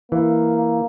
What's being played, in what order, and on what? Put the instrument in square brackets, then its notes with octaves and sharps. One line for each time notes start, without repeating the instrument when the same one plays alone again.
[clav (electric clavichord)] E3 [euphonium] A#3